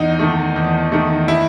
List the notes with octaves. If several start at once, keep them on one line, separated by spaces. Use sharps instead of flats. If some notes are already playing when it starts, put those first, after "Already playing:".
Already playing: E2 D#4
D#3 A3
E2
D#3 A3
E4